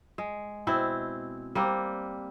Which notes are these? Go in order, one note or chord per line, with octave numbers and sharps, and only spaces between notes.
G#3
B2 C4 E4
G3 A#3 C4